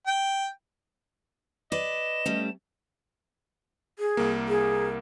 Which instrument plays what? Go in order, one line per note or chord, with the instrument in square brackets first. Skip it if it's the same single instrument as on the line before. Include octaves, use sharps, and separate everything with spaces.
[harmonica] G5
[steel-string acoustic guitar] B4 D5 [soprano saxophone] D#5 [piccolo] E7
[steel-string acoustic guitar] G3 A3 C#4
[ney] G#4
[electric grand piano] C2 A#3
[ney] G#4